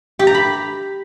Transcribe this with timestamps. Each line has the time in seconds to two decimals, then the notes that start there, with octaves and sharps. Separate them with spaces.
0.19 G4
0.27 A#5
0.35 B5